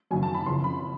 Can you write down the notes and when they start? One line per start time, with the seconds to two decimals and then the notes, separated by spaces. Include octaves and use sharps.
0.11 F#1 F#2 D#3 F#3 G#5
0.23 A5
0.34 B5
0.46 F#1 F2 C#3 E3 C6
0.64 B5